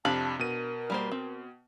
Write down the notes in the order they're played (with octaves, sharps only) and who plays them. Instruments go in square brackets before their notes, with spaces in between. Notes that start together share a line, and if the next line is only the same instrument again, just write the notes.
[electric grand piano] F2 C3 [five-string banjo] D4 F5 B5 [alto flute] A5
[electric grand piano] B2 D#7 [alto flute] A#4
[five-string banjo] G3 A#3 C5
C4